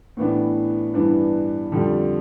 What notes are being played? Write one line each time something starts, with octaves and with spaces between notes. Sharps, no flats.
A2 E3 B3 D4
G2 E3 B3 D4
F2 D3 G3